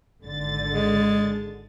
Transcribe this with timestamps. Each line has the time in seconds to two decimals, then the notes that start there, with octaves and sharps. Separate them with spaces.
0.23 G#1 D3 A6
0.73 G#3